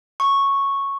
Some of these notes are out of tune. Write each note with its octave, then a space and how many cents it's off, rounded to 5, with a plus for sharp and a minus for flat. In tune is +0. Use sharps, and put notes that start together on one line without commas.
C#6 -5